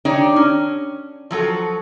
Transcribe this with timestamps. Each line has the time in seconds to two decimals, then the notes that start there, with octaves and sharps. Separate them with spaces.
0.05 D#3 D4 D#4 G4 C#5
0.36 C#4
1.31 F3 F#3 F#4 A4